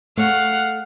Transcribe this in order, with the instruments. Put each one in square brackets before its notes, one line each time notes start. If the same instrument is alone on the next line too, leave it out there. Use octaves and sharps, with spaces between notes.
[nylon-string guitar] A3 C#5 [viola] F5 F#5